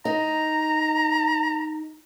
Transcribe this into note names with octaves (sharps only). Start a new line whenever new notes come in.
D#4 A#5